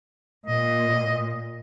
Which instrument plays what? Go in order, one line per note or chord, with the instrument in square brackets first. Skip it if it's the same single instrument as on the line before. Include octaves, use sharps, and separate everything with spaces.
[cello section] A#2 [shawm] D#5